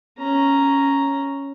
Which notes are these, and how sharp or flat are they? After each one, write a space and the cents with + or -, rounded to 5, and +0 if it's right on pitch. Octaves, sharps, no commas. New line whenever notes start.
C#4 +0 A#5 +0